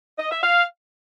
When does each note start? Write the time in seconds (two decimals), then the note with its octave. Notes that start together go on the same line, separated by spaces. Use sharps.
0.19 D#5
0.31 E5
0.43 F5